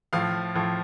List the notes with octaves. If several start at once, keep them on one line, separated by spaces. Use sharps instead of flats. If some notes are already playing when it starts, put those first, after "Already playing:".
A2 F3 F5
A2 F3